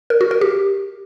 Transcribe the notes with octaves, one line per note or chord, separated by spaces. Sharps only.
A#4
F#4
A#4
G4